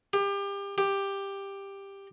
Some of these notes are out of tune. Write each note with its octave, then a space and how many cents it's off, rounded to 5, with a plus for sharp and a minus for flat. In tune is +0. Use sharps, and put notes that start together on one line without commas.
G4 +30
G4 +10